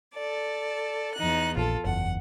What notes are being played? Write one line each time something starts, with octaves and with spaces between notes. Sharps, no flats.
A4 D5
E2 D#4 F#6
A#1 F4 A4
F#1 E2 F#5